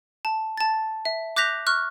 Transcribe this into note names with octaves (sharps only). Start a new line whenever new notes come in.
A5
A5 A6
E5
D6 F#6 G6 A#6 B6 F7
C#6 F6 F#6